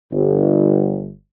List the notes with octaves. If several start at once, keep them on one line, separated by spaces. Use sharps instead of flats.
G1